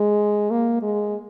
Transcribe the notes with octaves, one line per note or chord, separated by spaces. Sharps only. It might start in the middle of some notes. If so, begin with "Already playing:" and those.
Already playing: G#3
A#3
G#3